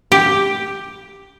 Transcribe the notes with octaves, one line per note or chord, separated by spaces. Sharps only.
G4